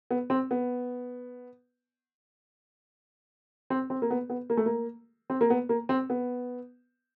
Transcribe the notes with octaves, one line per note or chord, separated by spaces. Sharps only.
B3
C4
B3
C4
C4
A#3
B3
B3
A#3
A3
A#3
C4
A#3
B3
A#3
C4
B3